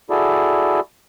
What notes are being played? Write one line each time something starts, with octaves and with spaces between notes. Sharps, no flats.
E4 F#4 G#4 A4 D5